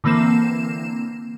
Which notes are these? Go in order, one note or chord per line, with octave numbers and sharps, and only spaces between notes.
D3 E3 A#3 C4 E7